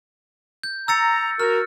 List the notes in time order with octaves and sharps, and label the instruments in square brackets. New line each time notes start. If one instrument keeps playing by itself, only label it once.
[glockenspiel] G6
[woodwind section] A#5 [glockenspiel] E6 A6 C#7
[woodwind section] F#4 A#4 [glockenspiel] F6